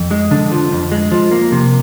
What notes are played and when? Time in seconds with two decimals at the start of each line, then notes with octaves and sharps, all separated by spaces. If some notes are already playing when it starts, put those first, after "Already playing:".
Already playing: F2
0.11 G#3
0.31 D3
0.52 F3
0.72 F2
0.92 G#3
1.12 F3
1.31 A#3
1.52 C3